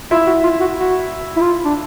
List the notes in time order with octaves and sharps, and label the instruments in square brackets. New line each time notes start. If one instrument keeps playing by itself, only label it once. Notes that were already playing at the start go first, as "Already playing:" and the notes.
[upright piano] E4 E5 [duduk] F4
[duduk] F#4
F4
F#4
F#4
E4
F4
D4